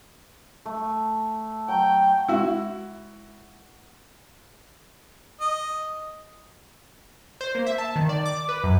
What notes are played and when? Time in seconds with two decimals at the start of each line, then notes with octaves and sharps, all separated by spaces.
0.66 A3
1.68 F#3 G5
2.29 G#3 E4 F#4
5.41 D#5
7.41 C5
7.55 A#3
7.67 E5
7.78 A5
7.96 D#3
8.09 D5
8.26 D6
8.49 B4
8.64 F#2